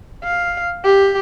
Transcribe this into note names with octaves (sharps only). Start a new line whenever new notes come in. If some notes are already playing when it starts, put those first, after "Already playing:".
F5
G4